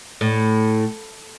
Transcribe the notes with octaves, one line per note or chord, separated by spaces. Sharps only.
A2